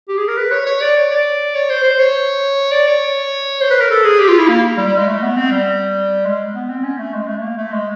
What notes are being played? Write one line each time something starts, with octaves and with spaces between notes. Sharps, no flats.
G4
G#4
A#4
B4
C#5
C#5
D5
C#5
D5
C#5
C5
C5
C#5
D5
C#5
C5
B4
A#4
A4
G#4
G4
F4
E4
A#3
G3
G3
G#3
A3
B3
C4
G3
G#3
B3
C4
C#4
A3
G#3
A3
A3
A#3
A3
G#3